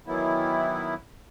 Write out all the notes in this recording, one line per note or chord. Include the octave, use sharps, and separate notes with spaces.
D#3 E3 F#3 B3 E4